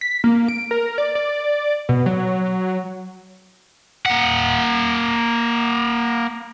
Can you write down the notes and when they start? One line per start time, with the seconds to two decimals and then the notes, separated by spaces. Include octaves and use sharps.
0.01 B6
0.24 A#3
0.48 D7
0.71 A#4
0.98 D5
1.15 D5
1.89 B2
2.06 F#3
4.06 A#3 F#5